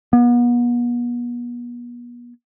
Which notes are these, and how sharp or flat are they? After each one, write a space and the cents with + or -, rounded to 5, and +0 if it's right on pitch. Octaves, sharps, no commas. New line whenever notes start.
B3 -40